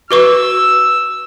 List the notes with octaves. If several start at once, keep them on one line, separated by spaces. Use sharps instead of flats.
F#4 B4 C#6 E6